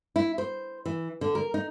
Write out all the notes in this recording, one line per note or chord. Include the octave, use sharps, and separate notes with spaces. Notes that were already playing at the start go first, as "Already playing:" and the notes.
E4
C5
E3
D3
A#4
D#4